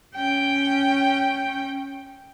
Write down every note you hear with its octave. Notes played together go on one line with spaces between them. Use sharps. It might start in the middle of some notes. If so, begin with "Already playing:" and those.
C#4 G5